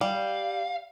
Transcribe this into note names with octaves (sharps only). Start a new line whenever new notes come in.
G3 F5